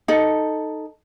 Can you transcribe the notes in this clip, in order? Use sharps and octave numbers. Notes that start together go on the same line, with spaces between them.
D#4 A4